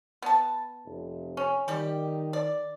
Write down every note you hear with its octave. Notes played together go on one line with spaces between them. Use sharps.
B3 A5
F1
C#4
D#3 G3 G4
D5